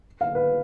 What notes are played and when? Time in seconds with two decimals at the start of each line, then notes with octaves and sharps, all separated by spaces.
0.21 F5
0.35 B4